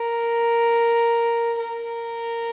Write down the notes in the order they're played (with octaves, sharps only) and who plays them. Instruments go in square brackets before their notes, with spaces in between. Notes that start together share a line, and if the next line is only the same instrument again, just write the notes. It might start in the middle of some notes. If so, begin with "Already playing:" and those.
Already playing: [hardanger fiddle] A#4
A#4